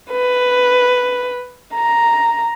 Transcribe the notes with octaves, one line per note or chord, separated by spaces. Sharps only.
B4
A#5